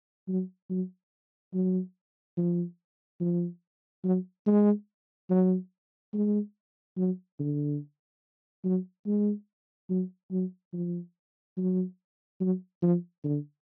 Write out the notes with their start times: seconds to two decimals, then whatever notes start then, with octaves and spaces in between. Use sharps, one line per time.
0.28 F#3
0.70 F#3
1.54 F#3
2.37 F3
3.20 F3
4.04 F#3
4.46 G#3
5.30 F#3
6.14 G#3
6.97 F#3
7.39 D3
8.64 F#3
9.06 G#3
9.89 F#3
10.31 F#3
10.73 F3
11.57 F#3
12.41 F#3
12.82 F3
13.24 D3